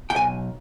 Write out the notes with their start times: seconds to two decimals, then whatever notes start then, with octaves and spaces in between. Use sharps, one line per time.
0.10 G5
0.16 B1 G#5